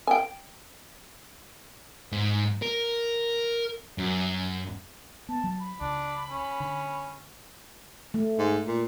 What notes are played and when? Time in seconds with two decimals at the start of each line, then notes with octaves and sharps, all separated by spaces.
0.07 G5 G#5
2.12 G#2
2.62 A#4
3.98 F#2
5.29 B3 A5
5.44 F#3
5.59 B5
5.81 C#2 D4
6.30 C#4
6.60 D3
8.14 A3
8.38 G#2
8.66 A#2